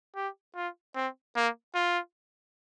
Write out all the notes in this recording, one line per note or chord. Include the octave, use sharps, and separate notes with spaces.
G4
F4
C4
A#3
F4